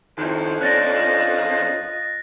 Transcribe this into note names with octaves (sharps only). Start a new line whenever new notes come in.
F2 D#3 F3
C#4 D4 F4 D#5 F#6 A6 A#6